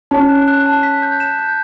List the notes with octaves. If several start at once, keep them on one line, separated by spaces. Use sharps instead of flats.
C#4 A5
F#6
F#6
A5
B6
G6
E7
G6